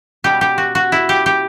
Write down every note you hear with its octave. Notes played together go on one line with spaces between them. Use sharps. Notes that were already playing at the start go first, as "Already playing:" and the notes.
B2 G3 G4
G4
F#4
F#4
E4
G4
G4